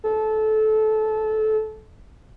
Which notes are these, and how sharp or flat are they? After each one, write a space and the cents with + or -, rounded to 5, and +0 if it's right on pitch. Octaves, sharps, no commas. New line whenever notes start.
A4 -20